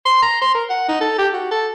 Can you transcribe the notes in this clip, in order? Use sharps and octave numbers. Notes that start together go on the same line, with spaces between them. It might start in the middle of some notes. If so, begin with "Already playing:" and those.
C6
A#5
C6
A#4
F#5
D#4
A4
G4
F#4
A4